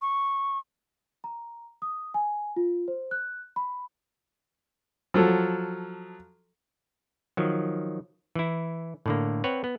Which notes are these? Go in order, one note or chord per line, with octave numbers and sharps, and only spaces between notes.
C#6
A#5
D#6
G#5
F4
C5
F#6
B5
F3 F#3 A4
D#3 F3 F#3
E3 E4
A2 D3 A#3
C4 B4 C#5 F#5
B3